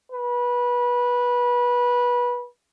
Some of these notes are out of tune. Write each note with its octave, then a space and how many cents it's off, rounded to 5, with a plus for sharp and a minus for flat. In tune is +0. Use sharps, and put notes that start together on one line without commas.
B4 -20